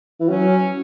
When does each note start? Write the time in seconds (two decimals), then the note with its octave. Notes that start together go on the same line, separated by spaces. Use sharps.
0.20 E3
0.29 F#3 C#4